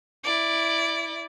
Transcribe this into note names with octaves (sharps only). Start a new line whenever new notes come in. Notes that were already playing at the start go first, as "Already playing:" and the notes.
E4 D5